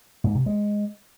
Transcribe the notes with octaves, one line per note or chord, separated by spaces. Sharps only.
G#2
C3
G#3